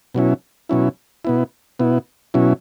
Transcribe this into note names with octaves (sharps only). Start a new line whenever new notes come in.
B2 F#3 C#4 E4
B2 F#3 C#4 E4
B2 B3 E4
B2 B3 E4
B2 F#3 C#4 E4